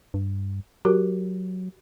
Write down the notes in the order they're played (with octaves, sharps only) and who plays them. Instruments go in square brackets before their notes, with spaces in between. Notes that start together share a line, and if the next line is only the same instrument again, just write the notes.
[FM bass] G2
[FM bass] F#3 [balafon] F#4 G4 A#4